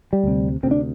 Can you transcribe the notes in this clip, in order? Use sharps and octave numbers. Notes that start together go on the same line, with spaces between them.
G3
D2 C3
D2 C3 C4
D4